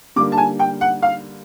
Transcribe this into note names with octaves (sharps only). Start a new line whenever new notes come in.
D3 G3 A#3 D6
A5
G#5
G5
F#5
F5